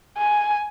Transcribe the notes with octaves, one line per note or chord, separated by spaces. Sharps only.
G#5